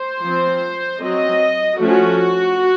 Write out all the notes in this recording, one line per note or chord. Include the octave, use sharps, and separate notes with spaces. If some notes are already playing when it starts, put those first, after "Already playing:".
Already playing: C5
F3 C4
F#3 C4 D#5
F3 A3 C#4 F#4